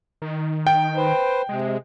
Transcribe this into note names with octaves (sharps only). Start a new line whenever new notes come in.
D#3
G5
B4 C5
C3 G#3